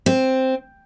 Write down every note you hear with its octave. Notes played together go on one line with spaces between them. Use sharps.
C4